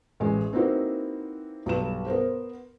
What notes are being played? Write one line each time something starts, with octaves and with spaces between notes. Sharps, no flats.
A1 G#3
A#3 C4 D#4 E4 F#4 B4
B1 G2 B4 E7
B3 A#4 C5